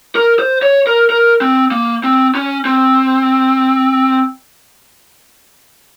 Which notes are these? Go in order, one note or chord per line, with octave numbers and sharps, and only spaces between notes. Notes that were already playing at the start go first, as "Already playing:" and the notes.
A#4
C5
C#5
A#4
A#4
C4
A#3
C4
C#4
C4